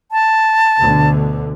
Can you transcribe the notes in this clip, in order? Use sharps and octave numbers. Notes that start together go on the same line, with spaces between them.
A5
D2 B2 D3